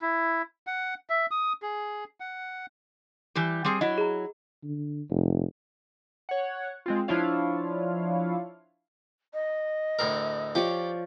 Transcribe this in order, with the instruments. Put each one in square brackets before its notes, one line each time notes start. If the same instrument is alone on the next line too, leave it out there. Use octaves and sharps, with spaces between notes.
[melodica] E4
F#5
E5
D#6
G#4
F#5
[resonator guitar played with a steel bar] E3 G3 G4
G3 C4 G#4
[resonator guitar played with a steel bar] F#3 E4 [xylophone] D#5
[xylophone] G#4 A#5
[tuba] D3
F1
[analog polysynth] C#5 F#5
G#3 C4 F4
F3 D4 E4 F4 C#5 F5
[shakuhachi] D#5
[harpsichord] D2 A2 A#4
[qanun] F3 C#5 D5 [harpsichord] G4